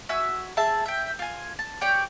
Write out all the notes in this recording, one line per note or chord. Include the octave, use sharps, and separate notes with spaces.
F#4 E5 G#5 E6
G#4 E5 A5
E5 G5
F4 G#5
A5
G4 C#5 D5 G5